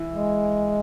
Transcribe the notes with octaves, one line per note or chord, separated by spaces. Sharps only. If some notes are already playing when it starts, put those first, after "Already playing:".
Already playing: E3
G#3